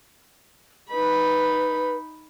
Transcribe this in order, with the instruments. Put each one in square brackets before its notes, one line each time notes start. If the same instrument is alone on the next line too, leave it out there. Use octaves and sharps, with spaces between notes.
[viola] D#4 B5 [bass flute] B4